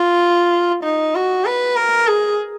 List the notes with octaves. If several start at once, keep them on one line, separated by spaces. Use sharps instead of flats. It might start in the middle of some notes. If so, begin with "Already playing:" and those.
Already playing: F4
D#4
F#4
B4
A#4
G#4